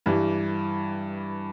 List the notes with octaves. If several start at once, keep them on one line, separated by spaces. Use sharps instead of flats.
G2 E3 G3